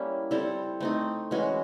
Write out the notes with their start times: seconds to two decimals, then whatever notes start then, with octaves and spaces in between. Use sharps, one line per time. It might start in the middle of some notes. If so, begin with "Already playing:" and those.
Already playing: G3 A#3 C#4 E4
0.31 G3 C4 E4 A4
0.80 A3 C4 D#4
1.31 E3 G#3 C#4 F#4